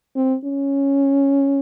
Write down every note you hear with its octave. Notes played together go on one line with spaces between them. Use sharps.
C4
C#4